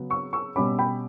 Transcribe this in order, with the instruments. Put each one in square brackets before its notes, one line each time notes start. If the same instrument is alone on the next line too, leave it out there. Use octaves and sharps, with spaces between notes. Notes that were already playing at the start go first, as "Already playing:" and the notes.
Already playing: [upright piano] C#3 F#3 B3
C#6 E6
C#6 E6
B2 G3 C#4 B5 D6
G5 B5